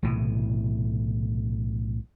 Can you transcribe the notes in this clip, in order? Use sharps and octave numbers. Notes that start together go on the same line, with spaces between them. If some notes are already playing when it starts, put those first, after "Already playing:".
B1 A2 C3 E3